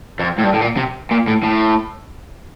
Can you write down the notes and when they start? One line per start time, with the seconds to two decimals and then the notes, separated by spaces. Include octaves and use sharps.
0.19 F2
0.39 A2
0.44 G2
0.54 A2
0.61 A#2
0.77 C3
1.11 A#2
1.27 A2
1.43 A2